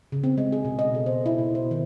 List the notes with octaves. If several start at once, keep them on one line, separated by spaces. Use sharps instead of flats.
C#3
C4
G#3
G#4
B2
D#5
A4
C5
E4
B2
C5
D#3